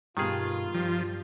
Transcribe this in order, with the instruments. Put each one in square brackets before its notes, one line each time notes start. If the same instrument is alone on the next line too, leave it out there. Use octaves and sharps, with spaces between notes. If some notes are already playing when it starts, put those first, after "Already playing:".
[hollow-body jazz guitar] G2 B2 [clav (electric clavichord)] D#3 G#4 [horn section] F4
[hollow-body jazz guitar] G2 [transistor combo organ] F3